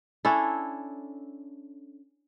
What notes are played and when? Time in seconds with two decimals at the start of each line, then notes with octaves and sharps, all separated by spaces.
0.25 C#4 D4 E4 A4